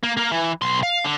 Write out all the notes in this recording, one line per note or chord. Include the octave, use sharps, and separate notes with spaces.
A#3
A#3 A#4
E3
B1 C6
F5
D3